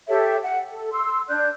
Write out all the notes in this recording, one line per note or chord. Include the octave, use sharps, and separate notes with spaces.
G4 A4 C#5 E5
F#5
A4
C6 E6
D4 D5 F#6 G6